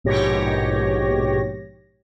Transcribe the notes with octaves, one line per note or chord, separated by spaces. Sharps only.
A#1 G#2 B2 G4 C#5 A#6